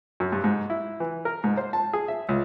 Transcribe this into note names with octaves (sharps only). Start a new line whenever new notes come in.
F#2
G2
G#2
E4
E3
A#4
G#2
C5
A5
G#4
E5
C#2